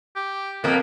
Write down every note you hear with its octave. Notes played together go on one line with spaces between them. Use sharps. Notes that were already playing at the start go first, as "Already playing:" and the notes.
G4
F2 A#3 B3